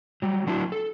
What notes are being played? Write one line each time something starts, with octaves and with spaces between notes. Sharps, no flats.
F#3 G3
F#3 D4 E4 F#4
A4